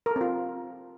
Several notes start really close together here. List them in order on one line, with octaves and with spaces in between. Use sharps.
A#4 A4 C4 F4